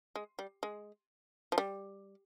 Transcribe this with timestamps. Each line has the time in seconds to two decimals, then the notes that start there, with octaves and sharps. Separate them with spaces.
0.16 G#3
0.39 G3
0.63 G#3
1.52 F3
1.58 G3